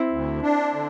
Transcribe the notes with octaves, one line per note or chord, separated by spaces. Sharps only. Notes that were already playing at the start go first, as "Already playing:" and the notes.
Already playing: C4 E4
D2
D4
D3